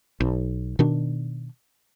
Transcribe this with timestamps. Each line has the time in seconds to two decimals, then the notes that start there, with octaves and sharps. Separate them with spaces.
0.20 B1
0.79 B2 D#3 D4